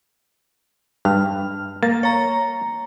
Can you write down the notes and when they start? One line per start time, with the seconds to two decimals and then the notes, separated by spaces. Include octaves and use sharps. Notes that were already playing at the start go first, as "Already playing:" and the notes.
1.05 G2 F6
1.83 A#3 A6
2.03 C#5 A#5